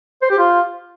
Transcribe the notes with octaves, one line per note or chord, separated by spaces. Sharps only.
C5
G4
F4